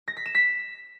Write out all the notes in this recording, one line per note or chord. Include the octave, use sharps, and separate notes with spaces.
A#6
B6
E7
B6